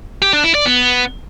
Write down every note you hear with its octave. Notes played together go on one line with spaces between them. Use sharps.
G4
D4
E4
D5
B3